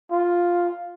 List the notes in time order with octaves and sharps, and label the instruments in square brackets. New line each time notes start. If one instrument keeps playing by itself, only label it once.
[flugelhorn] F4